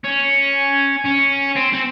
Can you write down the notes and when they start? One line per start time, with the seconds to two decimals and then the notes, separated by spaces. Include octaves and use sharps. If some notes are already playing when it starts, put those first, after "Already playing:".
0.04 C#4
1.06 C#4
1.56 C4
1.73 C4